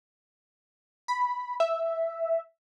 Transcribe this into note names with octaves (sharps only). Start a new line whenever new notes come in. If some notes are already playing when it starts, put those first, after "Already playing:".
B5
E5